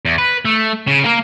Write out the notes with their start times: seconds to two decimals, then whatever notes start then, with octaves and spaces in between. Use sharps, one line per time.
0.05 E2
0.18 B4
0.45 A3
0.87 C#3
1.04 A#3 A#4